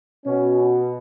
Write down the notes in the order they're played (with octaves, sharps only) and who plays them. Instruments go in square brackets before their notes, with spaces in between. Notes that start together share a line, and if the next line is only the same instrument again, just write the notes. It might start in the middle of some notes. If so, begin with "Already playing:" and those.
[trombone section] B2 C#4